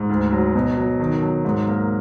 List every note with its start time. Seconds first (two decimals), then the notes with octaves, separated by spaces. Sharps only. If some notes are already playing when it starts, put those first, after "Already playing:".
Already playing: G#2
0.09 D2
0.32 F#3
0.55 B2
0.77 F#3
1.00 D#3
1.22 F#3
1.45 G#2
1.68 A#3